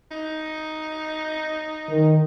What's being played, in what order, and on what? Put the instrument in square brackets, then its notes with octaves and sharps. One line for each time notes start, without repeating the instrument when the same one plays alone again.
[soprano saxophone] D#4
[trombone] D#3